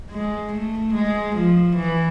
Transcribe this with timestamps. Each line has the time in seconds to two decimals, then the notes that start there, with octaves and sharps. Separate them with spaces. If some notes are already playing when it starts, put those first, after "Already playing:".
0.11 G#3
0.53 A3
0.94 G#3
1.35 F3
1.76 E3